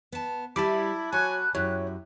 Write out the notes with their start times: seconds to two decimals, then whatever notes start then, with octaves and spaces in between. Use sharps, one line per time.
0.12 B3 A5
0.56 G3 E4 G4 A5 B5 D6
1.13 F#3 F#4 C#5 G#5 F#6
1.55 F#2 E4 G4 C#5